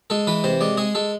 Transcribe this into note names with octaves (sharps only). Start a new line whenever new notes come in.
G#3 A4
E3 B4
C3 C5
G#3 D5
G#3 G#4
G#3 A4